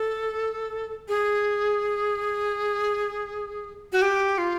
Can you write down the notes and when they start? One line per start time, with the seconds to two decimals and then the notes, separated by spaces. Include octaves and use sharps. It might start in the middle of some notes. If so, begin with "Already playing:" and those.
Already playing: A4
1.09 G#4
3.93 F#4
4.02 G4
4.38 F4